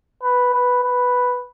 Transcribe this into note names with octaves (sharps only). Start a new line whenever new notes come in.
B4
B4
B4